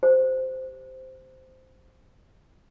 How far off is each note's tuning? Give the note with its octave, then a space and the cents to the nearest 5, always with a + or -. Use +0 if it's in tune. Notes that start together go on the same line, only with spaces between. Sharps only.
G4 +0 C5 -10